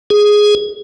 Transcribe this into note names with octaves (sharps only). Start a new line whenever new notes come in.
G#4